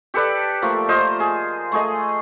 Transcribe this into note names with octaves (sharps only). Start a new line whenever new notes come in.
G4 A4 B4 D5
F3 A3 A#3
F4 C5 D#5
G#4
A3 G#4 D#5